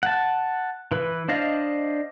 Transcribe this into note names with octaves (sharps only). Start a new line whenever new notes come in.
F#5 A5
E3 B4
D4 C5 D5 D#5 F5